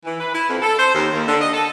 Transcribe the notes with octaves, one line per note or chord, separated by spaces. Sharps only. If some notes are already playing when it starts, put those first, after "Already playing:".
E3
B4
E4
F2
A4
C5
D#2
D#2
D3
D#5
A4